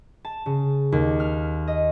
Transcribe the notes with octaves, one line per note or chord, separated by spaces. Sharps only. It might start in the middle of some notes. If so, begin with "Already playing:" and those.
A5
C#3
D#2
F6
D#5